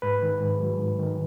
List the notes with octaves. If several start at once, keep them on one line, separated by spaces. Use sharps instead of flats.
G#2 B4
D#3
G#2
F#3
G#2
D#3